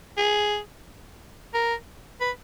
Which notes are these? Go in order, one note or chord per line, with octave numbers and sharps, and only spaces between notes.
G#4
A#4
B4